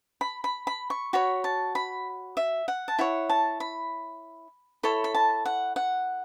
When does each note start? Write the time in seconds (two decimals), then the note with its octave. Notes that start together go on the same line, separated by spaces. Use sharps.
0.21 B5
0.44 B5
0.67 B5
0.90 C#6
1.13 F#4 C#5 B5
1.44 A5
1.75 B5
2.37 E5
2.68 F#5
2.88 A5
2.99 E4 C#5 F#5
3.29 A5
3.60 B5
4.83 E4 A4 C#5 B5
5.04 B5
5.14 A5
5.45 F#5
5.76 F#5